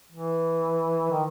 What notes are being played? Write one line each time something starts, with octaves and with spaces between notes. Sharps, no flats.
E3
D#3